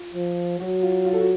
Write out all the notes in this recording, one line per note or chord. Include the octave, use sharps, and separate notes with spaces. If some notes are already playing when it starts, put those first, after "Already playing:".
Already playing: F4
F3
F#3 F#4
F4
F4
A4
F#4